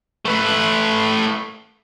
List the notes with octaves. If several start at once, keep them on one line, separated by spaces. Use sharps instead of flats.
A3 B4